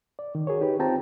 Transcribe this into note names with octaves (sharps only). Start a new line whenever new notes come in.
D5
D#3
F#4 G#4 A#4 C#5
D#4 G4 B4
C4 F4 C5 G5 A5 A#5